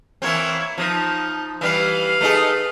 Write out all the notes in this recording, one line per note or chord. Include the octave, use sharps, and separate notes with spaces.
E3 A#3 C4 E4 C#5
F3 D#4
E3 G3 B4 F5
A3 D#4 G#4